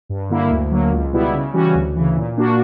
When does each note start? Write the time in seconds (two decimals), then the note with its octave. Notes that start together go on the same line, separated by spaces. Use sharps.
0.09 G2
0.30 D3 A#3 E4
0.50 D2
0.71 D3 F#3 A#3
0.92 C#2
1.12 B2 G3 B3 E4
1.34 C#3
1.53 E3 G3 C#4 F#4
1.75 D2
1.96 C#3 E3
2.17 A#2
2.37 A#3 D4 F#4